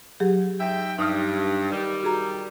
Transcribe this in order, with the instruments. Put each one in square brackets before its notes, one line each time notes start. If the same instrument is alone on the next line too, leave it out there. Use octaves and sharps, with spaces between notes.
[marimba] F#3 G4 G#4
[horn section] G#2 E5 G5
[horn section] G2 [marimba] D#4 D#6 F6
[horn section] D#3 G3
[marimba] F#4 G#4 A#5